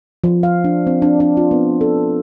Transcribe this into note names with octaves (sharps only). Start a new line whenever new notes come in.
F3
F5
D4
C4
D4
D4
F4
B3
A4